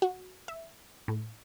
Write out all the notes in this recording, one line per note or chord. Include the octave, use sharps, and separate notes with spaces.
F#4
E5
A2